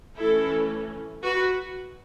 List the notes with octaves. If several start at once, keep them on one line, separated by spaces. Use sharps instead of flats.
E3 A3 C#4 E4 A4
F#4 B4